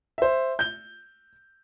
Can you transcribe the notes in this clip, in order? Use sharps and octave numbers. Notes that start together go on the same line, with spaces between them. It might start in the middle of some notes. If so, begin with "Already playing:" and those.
C5 E5
G6 G7